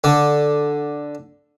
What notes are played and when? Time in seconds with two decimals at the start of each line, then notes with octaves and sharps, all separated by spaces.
0.04 D3